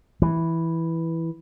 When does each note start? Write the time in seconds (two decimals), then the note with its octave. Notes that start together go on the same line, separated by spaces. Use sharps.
0.22 E3